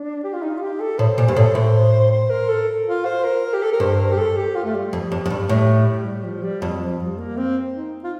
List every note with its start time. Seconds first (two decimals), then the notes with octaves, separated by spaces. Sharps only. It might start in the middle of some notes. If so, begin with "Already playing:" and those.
Already playing: D4
0.24 G4
0.34 F4
0.43 D#4
0.57 F4
0.61 G4
0.80 A4
0.99 A2 C5
1.18 A#2 C5
1.28 G2
1.36 A2 A4
1.55 A2 C5
2.11 C5
2.30 A#4
2.49 A4
2.87 F4
3.05 C5
3.24 A#4
3.54 G4
3.63 A4
3.72 A#4
3.80 G2 C5
3.99 A#4
4.12 G4
4.18 A4
4.36 G4
4.55 F4
4.64 A3
4.74 G3
4.93 F2
5.12 F2
5.26 F2
5.30 G2
5.49 A2
6.06 G3
6.24 F3
6.43 G3
6.62 F2 F3
6.75 F3
6.86 G3
6.90 F3
7.03 G3
7.18 A#3
7.37 C4
7.74 D#4
8.04 F4